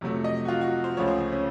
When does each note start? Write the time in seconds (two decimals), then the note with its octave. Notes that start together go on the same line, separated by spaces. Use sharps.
0.01 F2 C3 F#3 A3
0.24 D#5
0.45 F#4
0.48 F4
0.61 F#4
0.84 C5
0.96 C#2 C#3 F3 A3 C#5
1.08 C5
1.32 C#4